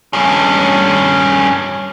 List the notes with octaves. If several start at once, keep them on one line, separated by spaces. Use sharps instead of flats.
G2 C#4